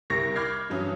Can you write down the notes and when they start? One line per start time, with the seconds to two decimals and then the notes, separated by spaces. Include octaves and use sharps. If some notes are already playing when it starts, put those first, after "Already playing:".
0.10 C2 G4 A#4 C#6 A#6
0.36 B5 D6 F6 G6 G#6 C7
0.70 G2 E3 F#3 C#4 D#6